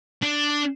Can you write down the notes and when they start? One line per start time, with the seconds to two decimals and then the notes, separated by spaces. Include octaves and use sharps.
0.22 D4